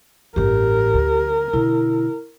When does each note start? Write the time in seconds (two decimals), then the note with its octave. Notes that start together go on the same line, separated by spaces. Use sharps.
0.36 A1 G2 G4 A#4
0.94 D2
1.53 B2 D3 E4